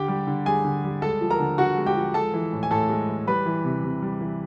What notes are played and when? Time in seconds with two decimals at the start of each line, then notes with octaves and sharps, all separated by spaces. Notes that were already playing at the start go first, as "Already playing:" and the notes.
Already playing: D3 G4 G5
0.08 G3
0.27 D3
0.46 G3 G#4 G#5
0.65 D3
0.84 G3
1.02 G#3 A4 A5
1.21 F3
1.30 A#4 A#5
1.40 D3
1.58 D3 F#4 F#5
1.77 G#3
1.86 G4 G5
1.96 F3
2.14 G#3 A4 A5
2.34 E3
2.52 A2
2.63 G#5
2.71 A2 A4 A5
2.90 G#3
3.09 E3
3.27 G3 B4 B5
3.46 E3
3.65 C3
3.83 C3
4.02 G3
4.21 E3